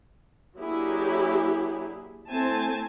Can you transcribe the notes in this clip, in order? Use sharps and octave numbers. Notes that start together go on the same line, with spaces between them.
F#3 A#3 D4 E4 G4 G#4
A3 C4 E4 G#5 A5